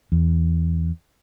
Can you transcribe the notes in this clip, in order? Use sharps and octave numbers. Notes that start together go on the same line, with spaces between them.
E2